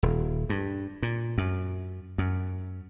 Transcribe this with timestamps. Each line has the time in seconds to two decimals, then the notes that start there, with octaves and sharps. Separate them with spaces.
0.03 D#1
0.49 G2
1.02 A#2
1.38 F#2
2.18 F#2